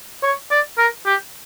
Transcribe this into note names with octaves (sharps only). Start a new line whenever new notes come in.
C#5
D5
A#4
G4